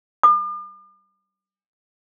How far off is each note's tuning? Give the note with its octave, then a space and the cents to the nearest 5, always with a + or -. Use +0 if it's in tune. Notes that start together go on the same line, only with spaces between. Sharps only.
D6 +45